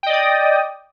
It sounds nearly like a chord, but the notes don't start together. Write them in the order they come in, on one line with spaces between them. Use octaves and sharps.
G5 D#5 D5 D#6